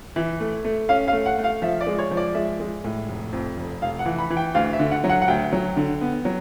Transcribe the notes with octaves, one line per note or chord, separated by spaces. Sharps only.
E3 E5
A3
A3
C#4 F5
F5
A3
F#5
A3
F5
F3 E5
D5
G#3
C#5
F3
D5
G#3 E5
G#3
A2
F1
F2
F1
F1 F5
F#5
E3
B5
E3
G5
D2 F5
E5
D3
F#5
F#3
F#5
F#5
D2 G5
F#3
D3
B3
F#3